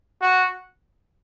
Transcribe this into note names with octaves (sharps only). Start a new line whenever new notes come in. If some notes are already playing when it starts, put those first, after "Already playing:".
F#4